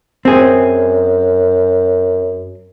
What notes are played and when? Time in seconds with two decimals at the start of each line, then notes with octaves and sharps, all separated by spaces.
0.25 F#2 C4 G#4